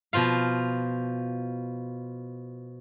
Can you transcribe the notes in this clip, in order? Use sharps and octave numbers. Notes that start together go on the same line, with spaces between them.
B2 F3 F4 F5